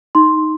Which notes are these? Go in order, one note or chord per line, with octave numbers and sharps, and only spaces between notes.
D#4 C6